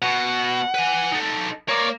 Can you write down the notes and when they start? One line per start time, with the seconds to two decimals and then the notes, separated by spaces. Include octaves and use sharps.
0.02 B2 F#5
0.74 B4 G#5
1.12 D#4 A4
1.69 A#3 C#5 D5